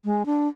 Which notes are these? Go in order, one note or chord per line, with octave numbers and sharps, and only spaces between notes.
G#3
D4